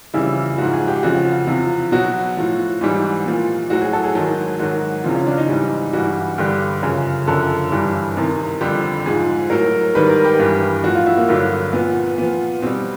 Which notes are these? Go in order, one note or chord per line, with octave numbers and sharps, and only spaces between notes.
F2 C#3 E3 G3 E4
G#2 F3 F#4
G#4
G4
F2 C#3 F3 F#4
E2 C3 F3
B2 F#3 F#4
A2 F3
G#2 E3 G3
A#2 F3
A2 F#3 F#4
G#4
A4
G#4
G#2 D#3 F#3
G#2 D#3 F#3 F#4
E2 C#3 F3 C4
C#4
D4
D#4
G#2 E3 G3
G2 E3 G3 F#4
G2 D3 G3 G4
F#2 C#3 F3 G#4
F#2 D3 F3 A4
G2 E3 G3
E2 C3 D#3
F2 D3 G3 G4
G#2 F3 G#4
A2 F#3 A#4
G#2 D#3 G3 B4
A#4
G4
G2 E3 G3
A2 F3 F#4
F4
E4
A#3
G2 D3 F#3
A#2 F3 B3
A#2 F3 B3
B2 G3 C4